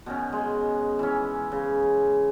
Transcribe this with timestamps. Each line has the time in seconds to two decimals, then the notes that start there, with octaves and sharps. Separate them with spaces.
0.06 B2 D#3 C#4
0.32 G#3
0.99 E3 C#4
1.52 C#3